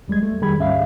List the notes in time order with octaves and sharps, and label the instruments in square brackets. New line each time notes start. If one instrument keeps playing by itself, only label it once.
[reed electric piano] E2 G3 G#3 G#6
A3
F2 D#3 G3 G#4 B5 G#6
D2 G#2 C#4 E5 F5